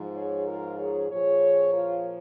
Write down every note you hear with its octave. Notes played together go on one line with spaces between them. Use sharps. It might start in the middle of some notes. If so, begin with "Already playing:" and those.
Already playing: G#2 F3
G#4 C#5
F4 A#4
G#4 C#5
A#2 F3 G#4 C#5
F4 A#4